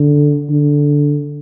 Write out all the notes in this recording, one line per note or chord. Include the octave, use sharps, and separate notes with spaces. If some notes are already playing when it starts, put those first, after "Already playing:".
Already playing: D3
D3